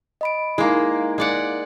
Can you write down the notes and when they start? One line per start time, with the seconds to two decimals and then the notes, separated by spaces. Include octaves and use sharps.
0.21 D#5 B5 D7
0.58 G#3 A#3 D#4 E4
1.18 G#3 D5 F#5